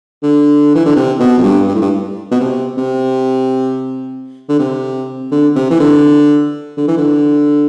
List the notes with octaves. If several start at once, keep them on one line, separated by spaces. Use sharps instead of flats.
D3
E3
D3
C3
B2
F2
G2
G2
A2
G2
B2
C3
C3
D3
C3
D3
C3
E3
D3
D3
E3
D3